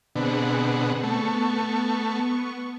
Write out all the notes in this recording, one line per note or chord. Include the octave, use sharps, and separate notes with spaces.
B2 D3 C4 G#4 F#5
A3 B3 C#6